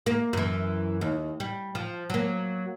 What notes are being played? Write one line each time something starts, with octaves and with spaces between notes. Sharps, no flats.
A#3
F#2 E3
D#2
G3
F3
F#3 A#3